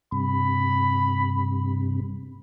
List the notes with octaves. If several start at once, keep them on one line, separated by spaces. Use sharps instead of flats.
G2 C3 B5